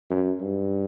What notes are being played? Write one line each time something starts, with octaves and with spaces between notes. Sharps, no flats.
F#2
G2